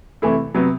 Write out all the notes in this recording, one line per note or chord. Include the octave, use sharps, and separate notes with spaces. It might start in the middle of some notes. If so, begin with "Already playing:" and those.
C3 E3 A3 E4
C3 F#3 B3